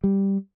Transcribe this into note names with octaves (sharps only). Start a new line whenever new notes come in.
G3